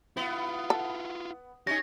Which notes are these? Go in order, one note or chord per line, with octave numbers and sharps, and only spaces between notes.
B3 E4 F4
A4
C#4 D#4 G4 G#5 A#6